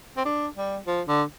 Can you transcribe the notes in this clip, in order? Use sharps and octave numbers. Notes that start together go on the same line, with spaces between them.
C4
D4
G3
F3
D3